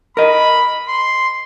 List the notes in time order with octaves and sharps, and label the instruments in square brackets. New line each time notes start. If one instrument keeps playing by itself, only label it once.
[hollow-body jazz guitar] A#4 D#5 [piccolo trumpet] B5
[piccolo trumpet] C6